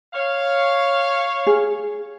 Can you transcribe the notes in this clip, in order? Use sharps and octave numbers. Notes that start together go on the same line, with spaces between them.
C#5 F5
G#4